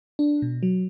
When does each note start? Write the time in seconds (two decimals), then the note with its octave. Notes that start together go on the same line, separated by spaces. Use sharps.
0.19 D4
0.42 B2
0.63 F#3